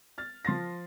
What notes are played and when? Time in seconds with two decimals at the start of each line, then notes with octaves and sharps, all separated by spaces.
0.18 F6 A6
0.45 F3 C6 A6 A#6